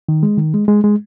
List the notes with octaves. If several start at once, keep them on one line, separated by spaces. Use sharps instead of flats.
D#3
G#3
D#3
G#3
G#3
G#3